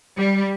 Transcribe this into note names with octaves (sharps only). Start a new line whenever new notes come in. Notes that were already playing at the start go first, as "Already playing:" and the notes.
G3